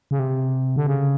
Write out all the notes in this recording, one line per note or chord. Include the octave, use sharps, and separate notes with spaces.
C#3
C3
D3
C#3